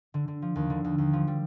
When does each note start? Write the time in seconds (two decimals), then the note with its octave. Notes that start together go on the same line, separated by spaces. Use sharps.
0.14 D3
0.28 D3
0.42 F3
0.56 D#2
0.70 D3
0.84 D#2
0.98 D#2
1.13 F3
1.27 G3